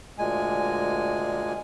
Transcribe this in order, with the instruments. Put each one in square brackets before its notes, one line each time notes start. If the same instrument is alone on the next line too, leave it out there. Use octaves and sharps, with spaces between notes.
[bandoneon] D2 A#2 G#3 G#5